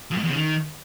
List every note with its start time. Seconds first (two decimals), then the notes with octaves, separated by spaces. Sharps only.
0.11 F2
0.18 G#2
0.24 E2
0.30 C#3
0.36 D#3